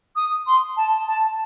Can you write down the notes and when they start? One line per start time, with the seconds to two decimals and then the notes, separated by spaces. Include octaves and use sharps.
0.16 D#6
0.47 C6
0.77 A5
1.07 A5